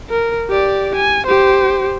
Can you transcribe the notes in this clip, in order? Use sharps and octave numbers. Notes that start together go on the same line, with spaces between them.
A#4
G4 D5
G#5
G4 C5